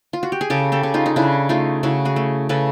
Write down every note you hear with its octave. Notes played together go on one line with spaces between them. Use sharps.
F4
F#4
G4
G#4
C#3 G4 A4
G4 A4
C#3
D#4 F4
D#4
C#3 D4 E4
A3 D#4 F4
C#3 E4 F#4
F#4 G#4
A3
C#3 A4 B4